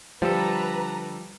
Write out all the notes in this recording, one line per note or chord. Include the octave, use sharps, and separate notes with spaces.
D3 F3 G3 A4 B4 A#5